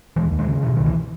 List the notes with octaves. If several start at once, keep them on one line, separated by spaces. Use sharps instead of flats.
D#2 E3 G#3
D#2
E3 G#3
C#3
B2 E3
C#2 D#3
E3